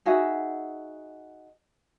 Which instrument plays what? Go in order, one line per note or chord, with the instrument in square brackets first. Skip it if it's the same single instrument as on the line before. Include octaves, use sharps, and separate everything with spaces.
[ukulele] D#4 F#4 G#4 E5